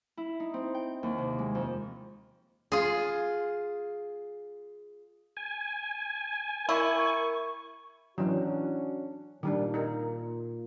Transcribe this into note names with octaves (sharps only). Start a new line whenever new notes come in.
E4
D#4
C4
G5
D#2
C3
G#3
F2
F4 G#4
G#5
A#3 E4 A#4 C#6
E3 F#3 C#4 D4 F#4
A#2 D#3 G3 D4
D#4 A#4